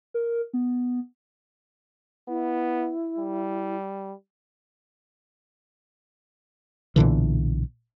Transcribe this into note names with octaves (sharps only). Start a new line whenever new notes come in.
A#4
B3
B3 E4
G3
B1 A#2 D3 E3